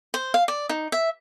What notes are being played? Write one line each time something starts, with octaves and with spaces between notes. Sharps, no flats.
C5
F5
D5
D#4
E5